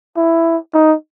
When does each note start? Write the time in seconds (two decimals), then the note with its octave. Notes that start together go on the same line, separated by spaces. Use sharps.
0.17 E4
0.74 D#4